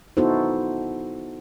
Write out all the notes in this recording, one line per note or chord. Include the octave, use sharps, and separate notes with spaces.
B3 D#4 E4 F#4 A4 C5